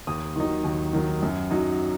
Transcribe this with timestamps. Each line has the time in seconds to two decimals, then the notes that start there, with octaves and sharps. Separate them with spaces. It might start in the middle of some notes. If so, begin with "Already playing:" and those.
0.07 D#2 D#6
0.36 D#3 F#3 D#4
0.64 D#2
0.93 D#3 F#3 D#4
1.22 F#2
1.51 F#3 D#4